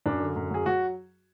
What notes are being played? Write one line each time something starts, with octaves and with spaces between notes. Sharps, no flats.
F#2 D4
D3
F#2
F#3 G#4
F#3 F#4